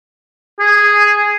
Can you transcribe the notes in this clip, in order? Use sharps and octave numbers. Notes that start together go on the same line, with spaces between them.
G#4